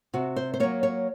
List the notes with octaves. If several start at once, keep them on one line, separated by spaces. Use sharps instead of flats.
C3 F#4
C5
C5
F#3 A#3 C#5
C#5